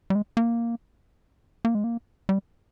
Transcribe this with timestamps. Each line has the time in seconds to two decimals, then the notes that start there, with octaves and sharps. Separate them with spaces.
0.10 G3
0.15 G#3
0.37 A#3
1.65 A#3
1.75 G#3
1.84 A#3
2.29 G3